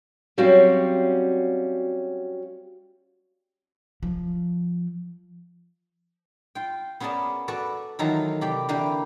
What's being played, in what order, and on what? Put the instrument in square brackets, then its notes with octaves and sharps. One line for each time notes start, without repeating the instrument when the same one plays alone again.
[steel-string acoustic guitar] F#3 G3 C4 C#4 F#4 F5
[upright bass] F3
[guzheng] F4 G5
B3 C#4 G#4 A#4 D5 A5
F#4 A4 B4 D5 B5
D#3 E3 F#3 F4 A4 A#5
C3 G4 D5 B5
D3 E3 A#3 E4 G4